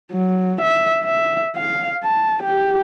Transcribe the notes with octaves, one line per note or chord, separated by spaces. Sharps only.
F#3
E5
E5
F5
A5
G4